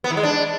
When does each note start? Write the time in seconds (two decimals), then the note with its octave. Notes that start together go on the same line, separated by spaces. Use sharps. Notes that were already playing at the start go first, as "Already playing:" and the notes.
0.04 B3
0.11 E3
0.17 G#3
0.23 D4